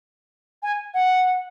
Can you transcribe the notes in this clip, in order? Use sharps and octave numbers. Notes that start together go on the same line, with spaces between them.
G#5
F#5